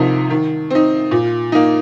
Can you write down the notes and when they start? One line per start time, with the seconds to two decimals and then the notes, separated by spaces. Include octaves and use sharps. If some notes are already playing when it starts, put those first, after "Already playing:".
Already playing: C2 C3 F3 D#4 A#4
0.30 D#3
0.70 C4 D#4
1.11 A#2
1.52 A#3 D#4